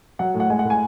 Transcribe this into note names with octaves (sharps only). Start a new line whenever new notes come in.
F#3 F#5
A2
F#5
G#3 G#5
F#5
A2
G#5